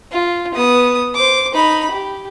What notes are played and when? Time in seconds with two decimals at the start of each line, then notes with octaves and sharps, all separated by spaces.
0.12 F4
0.54 B3 D#6
1.15 C5 D6
1.54 D#4 B5
1.91 G4